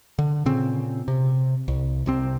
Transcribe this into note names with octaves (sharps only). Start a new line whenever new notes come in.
D3
A#2 C#3 C4
C3
C2
C2 C3 C4